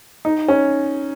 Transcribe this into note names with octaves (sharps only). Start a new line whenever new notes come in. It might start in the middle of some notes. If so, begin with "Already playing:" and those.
D#4
C#4